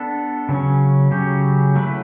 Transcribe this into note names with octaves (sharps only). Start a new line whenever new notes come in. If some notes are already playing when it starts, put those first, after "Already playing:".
Already playing: B3 D4 A4
C#3 F#3 C#4
C#3 F#3 C#4 G4
F#3 A3 E4 B4